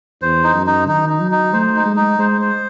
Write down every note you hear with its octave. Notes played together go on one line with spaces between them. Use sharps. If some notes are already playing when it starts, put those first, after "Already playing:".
E2 C5
D#4
F#2
D#4
D#3 D#4
D#4
F#3
D#4
A3 C5
D#4
G#3
D#4
G#3 C5
C5